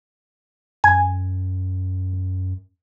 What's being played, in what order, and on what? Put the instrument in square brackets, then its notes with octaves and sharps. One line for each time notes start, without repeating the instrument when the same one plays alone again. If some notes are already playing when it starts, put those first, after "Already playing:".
[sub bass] F#2 [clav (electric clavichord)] G#5